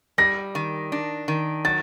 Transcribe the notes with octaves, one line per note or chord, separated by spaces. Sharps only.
G3 A#6
D#3
D4
D#3
F#3 A6